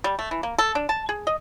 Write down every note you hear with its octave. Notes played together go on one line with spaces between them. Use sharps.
G3
A3
E3
A#3
A4
D4
A5
G#4
D#5